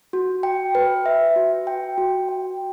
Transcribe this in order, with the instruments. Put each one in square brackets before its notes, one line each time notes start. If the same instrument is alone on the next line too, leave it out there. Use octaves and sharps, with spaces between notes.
[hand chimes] F#4
G5
B4
E5
F#4
G5
F#4
G5